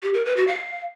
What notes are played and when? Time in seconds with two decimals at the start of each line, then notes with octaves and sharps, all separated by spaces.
0.03 G4
0.14 A#4
0.25 B4
0.36 F#4
0.48 F5